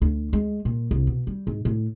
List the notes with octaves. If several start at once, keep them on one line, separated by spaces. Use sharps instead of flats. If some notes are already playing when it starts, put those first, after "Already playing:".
D2
G#3
A#2
C2
B2
G3
G#2
A2